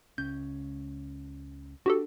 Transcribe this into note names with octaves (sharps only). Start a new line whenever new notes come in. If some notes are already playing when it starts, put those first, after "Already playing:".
C#2 C#4 G6
D4 F#4 G4 A4